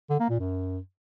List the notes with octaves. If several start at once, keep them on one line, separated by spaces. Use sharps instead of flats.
D3
A#3
A#2
F#2